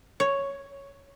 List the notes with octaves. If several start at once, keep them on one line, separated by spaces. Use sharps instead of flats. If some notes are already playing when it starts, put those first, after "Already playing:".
C#5